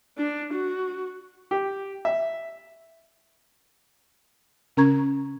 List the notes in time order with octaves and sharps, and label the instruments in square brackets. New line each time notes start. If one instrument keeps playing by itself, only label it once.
[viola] D4
F#4
[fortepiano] G4
E5
[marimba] C#3 C#4 A#4 A#5 C#6 G#6